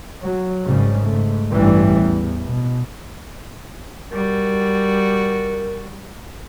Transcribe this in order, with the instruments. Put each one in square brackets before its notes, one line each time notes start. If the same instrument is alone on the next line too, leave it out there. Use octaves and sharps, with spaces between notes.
[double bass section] F#3
G#1 G#2 C#3 G3
G#2 A3
A1 G2 E3 G3
E2
B2
[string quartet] G3 F#4 [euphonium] A#4